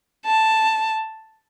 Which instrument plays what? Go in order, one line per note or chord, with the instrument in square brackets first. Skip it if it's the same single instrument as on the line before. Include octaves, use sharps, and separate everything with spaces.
[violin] A5